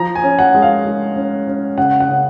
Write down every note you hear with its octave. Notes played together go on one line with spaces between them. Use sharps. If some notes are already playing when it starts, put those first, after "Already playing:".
Already playing: F3 A#5
G#5
C#4
F#5
G#3
F5
G#3
C#4
C#4
C#3 F#5
F#5
C#3